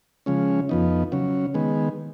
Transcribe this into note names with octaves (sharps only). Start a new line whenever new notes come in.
C#3 F3 G#3 C#4
F2 F3 B3 D#4
C#3 F#3 C#4
D#3 G#3 B3